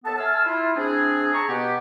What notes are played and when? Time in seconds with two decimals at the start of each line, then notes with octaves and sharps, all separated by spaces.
0.04 D#2 B3 A4 A5
0.17 E5 G#5 A5 C6 E6 F6
0.45 E4 F4
0.76 C3 C4 D4 G#4
1.33 G#4 A5 A#5 C#6
1.48 B2 B3 G4